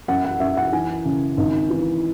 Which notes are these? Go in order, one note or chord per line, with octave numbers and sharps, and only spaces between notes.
F#2 F#5
F#5
F#2 E5
F#5
E3 G#5
C#3
G#1
E3